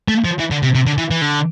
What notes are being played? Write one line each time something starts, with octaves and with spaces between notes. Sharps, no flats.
A3
F3
E3
D3
C3
C3
D3
E3
E3
D3